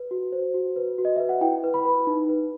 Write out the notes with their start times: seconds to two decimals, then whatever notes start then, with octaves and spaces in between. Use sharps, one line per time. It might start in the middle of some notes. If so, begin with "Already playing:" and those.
Already playing: B4
0.11 F#4
0.32 C5
0.54 F#4
0.76 B4
0.98 F#4
1.05 D#5
1.16 B4 E5
1.29 F#5
1.41 E4 G5
1.64 B4
1.74 B5
1.85 B4
2.07 D#4
2.29 B4